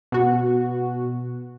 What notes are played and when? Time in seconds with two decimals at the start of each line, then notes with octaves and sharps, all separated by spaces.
0.12 B2 F#4